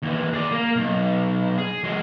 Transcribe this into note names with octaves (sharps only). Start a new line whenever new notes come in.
D#2 E3
G#4 D5
A#3
B1
G#4
F#3 G#3